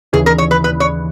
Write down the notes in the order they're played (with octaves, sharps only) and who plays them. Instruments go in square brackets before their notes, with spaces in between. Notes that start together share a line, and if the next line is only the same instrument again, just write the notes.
[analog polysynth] D#2 C#3 E3 [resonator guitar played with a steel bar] G#4
[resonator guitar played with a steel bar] A#4
C#5
B4
B4
C#5